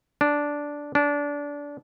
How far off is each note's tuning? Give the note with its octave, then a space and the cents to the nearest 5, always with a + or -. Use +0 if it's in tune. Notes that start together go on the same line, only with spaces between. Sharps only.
D4 -5
D4 -20